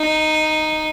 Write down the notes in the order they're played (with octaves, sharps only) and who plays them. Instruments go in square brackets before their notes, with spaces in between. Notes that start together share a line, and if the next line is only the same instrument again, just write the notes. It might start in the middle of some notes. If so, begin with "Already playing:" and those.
Already playing: [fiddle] D#4